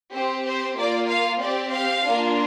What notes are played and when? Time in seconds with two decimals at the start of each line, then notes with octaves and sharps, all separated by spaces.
0.14 C4 G4 C5
0.46 C5
0.77 A#3 F4 D5
1.09 F5
1.41 C4 G4 D5
1.72 F5
2.04 A#3 D4 F4